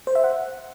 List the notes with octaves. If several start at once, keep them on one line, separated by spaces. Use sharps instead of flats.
C5
E5
F#5